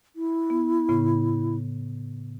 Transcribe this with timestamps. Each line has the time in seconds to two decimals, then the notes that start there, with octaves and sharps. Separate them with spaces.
0.16 E4
0.50 B3
0.89 A2 C#3 B3